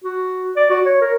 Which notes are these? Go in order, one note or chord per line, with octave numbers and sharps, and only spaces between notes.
F#4
D5
F#4
C#5
A#4